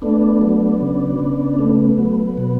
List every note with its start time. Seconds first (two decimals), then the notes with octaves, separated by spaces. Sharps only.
0.02 A3 B3 D4
0.41 F#3
0.81 C#3
1.20 C#3
1.59 A3 B3
1.99 F#3
2.38 B2